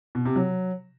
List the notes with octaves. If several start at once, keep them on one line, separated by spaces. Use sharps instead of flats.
B2
C3
F#3